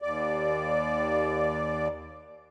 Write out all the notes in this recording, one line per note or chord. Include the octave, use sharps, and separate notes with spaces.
D#2 D5